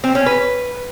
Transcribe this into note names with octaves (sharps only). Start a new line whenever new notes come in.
C4
C#4
B4